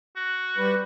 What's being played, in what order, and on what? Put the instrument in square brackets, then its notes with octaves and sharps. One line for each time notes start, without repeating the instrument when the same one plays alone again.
[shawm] F#4
[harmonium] G3 B4